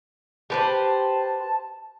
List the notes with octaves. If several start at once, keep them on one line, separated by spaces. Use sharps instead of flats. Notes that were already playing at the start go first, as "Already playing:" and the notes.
G4 B4 C5 A5